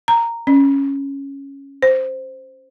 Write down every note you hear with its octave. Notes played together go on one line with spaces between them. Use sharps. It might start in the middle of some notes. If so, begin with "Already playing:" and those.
A#5
C#4
C5